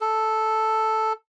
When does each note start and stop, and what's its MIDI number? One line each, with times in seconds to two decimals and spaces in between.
0.01 1.13 69